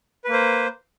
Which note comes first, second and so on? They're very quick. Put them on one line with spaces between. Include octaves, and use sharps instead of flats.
B4 A#3 C5